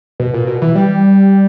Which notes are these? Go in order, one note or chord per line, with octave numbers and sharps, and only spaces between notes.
B2
A#2
B2
E3
G3